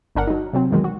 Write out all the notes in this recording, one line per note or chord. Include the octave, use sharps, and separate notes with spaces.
G1 D4 A#4 F#5
F#3 D#4
C3 F#3 C4
B1 E2 D#3 F#3 G#3
F#4